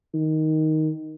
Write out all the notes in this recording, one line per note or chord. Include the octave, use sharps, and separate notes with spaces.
D#3